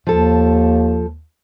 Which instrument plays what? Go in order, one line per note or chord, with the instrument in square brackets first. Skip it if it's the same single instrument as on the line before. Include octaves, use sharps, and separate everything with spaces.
[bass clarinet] D#2 [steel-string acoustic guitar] F3 A4